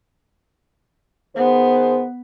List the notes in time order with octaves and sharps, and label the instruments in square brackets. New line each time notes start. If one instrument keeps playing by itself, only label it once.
[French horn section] D#3 G#4 C5 [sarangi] B3